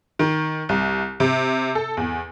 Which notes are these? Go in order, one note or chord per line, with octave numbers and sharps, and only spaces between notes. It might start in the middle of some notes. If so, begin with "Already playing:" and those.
D#3
C2
C3
A4
E2